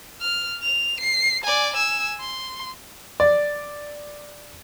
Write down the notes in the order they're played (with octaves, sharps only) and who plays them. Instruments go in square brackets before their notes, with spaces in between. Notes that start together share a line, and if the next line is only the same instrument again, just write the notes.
[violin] F6
F7
C7
D5 G#5
G#5 E6
C6
[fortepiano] D5